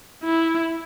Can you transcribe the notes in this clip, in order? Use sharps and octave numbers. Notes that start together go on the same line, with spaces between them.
E4